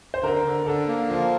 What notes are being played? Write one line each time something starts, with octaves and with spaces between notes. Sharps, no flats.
C5
D3 A#4
D3
D3 A4
A#3
F3 F4